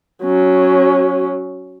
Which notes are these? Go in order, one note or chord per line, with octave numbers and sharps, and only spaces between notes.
F#3 C#4